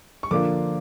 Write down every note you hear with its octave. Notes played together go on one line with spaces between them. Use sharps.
C#6
D3 F3 A#3 D4 F4 D6